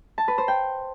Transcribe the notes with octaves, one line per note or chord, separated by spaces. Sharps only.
A5
B4
C5
G5